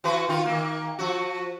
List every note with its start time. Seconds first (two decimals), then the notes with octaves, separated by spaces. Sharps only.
0.04 E3 F#4 B4
0.29 D#3 F4
0.46 D#3 A#3
0.99 F3 F#4